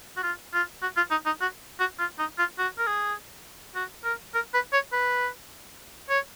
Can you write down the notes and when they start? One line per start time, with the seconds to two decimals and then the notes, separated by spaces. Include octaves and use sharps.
0.17 F#4
0.23 F4
0.53 F4
0.82 F#4
0.97 F4
1.11 D#4
1.26 D#4
1.41 F#4
1.80 F#4
1.99 F4
2.19 D#4
2.38 F4
2.58 F#4
2.78 A#4
2.87 G#4
3.75 F#4
4.04 A#4
4.34 A#4
4.54 B4
4.73 C#5
4.92 B4
6.10 C#5